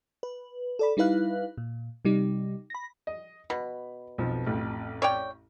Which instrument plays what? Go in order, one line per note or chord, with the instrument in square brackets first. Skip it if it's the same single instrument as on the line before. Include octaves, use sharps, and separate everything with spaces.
[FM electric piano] B4
A4 D5 B5
G3 D#4 E4 B4 F5 F#6
A#2
C3 G3 D#4
B5 A#6
[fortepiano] D#5
[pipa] B2 [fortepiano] B5
[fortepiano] B1 F2 F3
A1 F2
[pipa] C#5 D5 G5